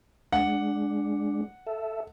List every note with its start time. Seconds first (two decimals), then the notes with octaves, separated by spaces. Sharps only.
0.32 G#3 D4 F#5
1.67 A4 E5